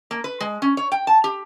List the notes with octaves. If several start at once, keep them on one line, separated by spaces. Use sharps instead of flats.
A#3
B4
G#3
C#4
C#5
G5
A5
G4